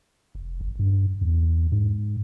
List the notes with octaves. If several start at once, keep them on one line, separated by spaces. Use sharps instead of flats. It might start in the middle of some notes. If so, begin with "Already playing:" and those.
F1
G1
G2
E2
G#2